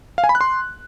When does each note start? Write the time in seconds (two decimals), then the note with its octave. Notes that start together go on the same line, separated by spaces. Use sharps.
0.18 F5
0.24 G#5
0.29 B5
0.35 F#6
0.41 C6